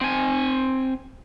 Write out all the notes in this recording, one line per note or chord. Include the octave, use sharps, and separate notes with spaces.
C4 G#5